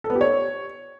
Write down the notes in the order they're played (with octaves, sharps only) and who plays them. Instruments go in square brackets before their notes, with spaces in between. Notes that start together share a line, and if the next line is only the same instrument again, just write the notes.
[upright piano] A4
B3
G4
C#5